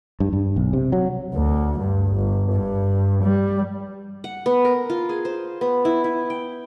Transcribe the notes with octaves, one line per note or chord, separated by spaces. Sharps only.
G2
G2
B1
C3
F#3
D2
G2
G1
G2
G3
F#5
B3
A#4
F4
G#4
C5
B3
E4
E4
G5